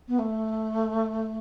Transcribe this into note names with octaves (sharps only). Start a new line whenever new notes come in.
B3
A3